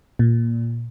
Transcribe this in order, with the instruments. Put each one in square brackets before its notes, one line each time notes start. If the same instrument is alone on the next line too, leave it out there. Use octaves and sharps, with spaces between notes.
[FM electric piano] A#2